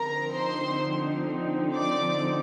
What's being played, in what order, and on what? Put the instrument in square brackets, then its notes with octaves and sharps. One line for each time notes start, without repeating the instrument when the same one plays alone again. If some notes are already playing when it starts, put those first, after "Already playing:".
Already playing: [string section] D3 F3 C4 D#4 A#4 A#5
C5 C6
D5 D6